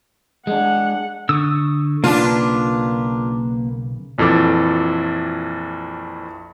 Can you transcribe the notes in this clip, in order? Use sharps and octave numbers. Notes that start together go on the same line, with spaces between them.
G#3 D4 F#5
D3 C#6 D#6 E6
B1 C#3 A#3 D4 F4 B4
A#1 F2 E3 A4 D6